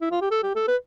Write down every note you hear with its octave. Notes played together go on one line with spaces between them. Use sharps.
E4
F4
G4
A4
G4
A4
B4